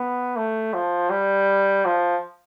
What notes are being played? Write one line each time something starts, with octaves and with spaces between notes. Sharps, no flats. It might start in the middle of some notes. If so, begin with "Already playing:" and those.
Already playing: B3
A3
F3
G3
F3